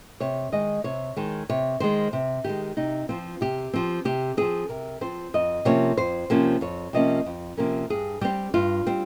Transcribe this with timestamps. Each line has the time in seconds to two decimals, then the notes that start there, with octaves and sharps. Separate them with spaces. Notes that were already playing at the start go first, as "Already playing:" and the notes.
0.20 C3 C#5
0.52 D#3 G#3 D#5
0.84 C3 C#5
1.16 D#3 G#3
1.50 C3 C#5
1.80 D#3 G#3 C5
2.13 C3
2.44 D#3 G#3 G4
2.77 C3 D#4
3.09 F3 C4 F4
3.41 C3 G4
3.73 F3 C4
4.05 C3 G4
4.37 F3 C4 G#4
4.69 C3 A#4
5.01 F3 C4 C5
5.34 F2 D#5
5.65 C3 F3 A#3 C#4 C#5
5.97 F2 C5
6.30 C3 F3 A#3 C#4
6.61 F2 C#5
6.93 C3 F3 A#3 C#4 D#5
7.26 F2
7.57 C3 F3 A#3 C#4 A#4
7.90 G2 G#4
8.21 G3 C4 G4
8.54 G2 F4
8.86 G3 C4